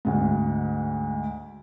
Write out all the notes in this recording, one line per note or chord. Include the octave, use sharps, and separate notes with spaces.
D2 G#2